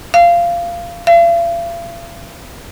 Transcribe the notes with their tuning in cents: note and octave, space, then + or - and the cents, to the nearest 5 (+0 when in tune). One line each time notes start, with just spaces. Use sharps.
F5 -15
F5 -45